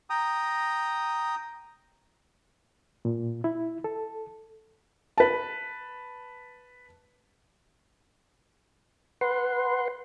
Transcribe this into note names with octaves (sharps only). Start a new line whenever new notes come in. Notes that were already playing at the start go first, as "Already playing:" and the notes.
G5 A#5 D#6
A#2
E4
A4
B4 A5
B4 F#5 C6